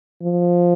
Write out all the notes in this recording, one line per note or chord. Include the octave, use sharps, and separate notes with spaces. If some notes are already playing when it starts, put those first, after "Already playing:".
F3